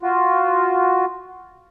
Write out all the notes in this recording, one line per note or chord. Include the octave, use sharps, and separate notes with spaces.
F4 F#4